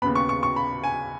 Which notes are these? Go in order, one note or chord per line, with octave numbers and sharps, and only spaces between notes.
D#2 C#3 B3 B5
C#6
C#6
C#6
B5
G#5